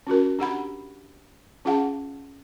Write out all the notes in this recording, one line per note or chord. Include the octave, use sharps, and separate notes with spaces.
C#4 F4 F#4 A#4
D4 G4 F#5 B5
C#4 F4 G#4 F5 F#5 A5